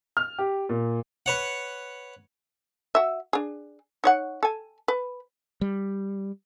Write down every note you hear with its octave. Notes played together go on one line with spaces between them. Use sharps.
F6
G4
A#2
B4 C#5 F#5
F#4 E5
D4 G#4
D#4 C#5 F#5
A4 G#5
B4
G3